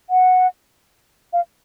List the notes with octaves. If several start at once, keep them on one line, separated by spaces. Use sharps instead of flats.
F#5
F5